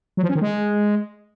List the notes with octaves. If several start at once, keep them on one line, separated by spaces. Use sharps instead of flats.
F#3
F3
C#4
D#3
G#3